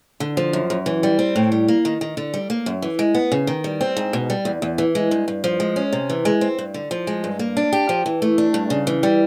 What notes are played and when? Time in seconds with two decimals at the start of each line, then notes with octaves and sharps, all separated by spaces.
0.20 D3
0.37 F3
0.53 F#2
0.70 F#2
0.86 E3
1.03 G3
1.19 C4
1.36 A2
1.52 G3
1.68 A#3
1.85 D#3
2.01 D#3
2.17 D3
2.34 G3
2.50 A#3
2.66 F#2
2.82 E3
2.99 G#3
3.15 B3
3.32 C#3
3.47 D#3
3.64 G3
3.81 C4
3.97 G#2
4.13 B2
4.30 G3
4.45 E2
4.62 E2
4.78 E3
4.95 G#3
5.11 G2
5.28 G2
5.44 F3
5.60 G#3
5.76 C#4
5.93 C3
6.10 E3
6.25 G#3
6.41 C4
6.59 G2
6.74 D3
6.91 F3
7.07 G#3
7.24 G2
7.39 A#3
7.57 D4
7.73 G4
7.89 F3
8.06 E3
8.22 A3
8.38 D4
8.54 G2
8.70 C#3
8.87 E3
9.03 G3